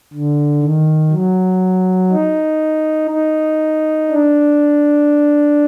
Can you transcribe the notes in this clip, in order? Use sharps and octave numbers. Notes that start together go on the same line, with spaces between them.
D3
D#3
F#3
D#4
D#4
D4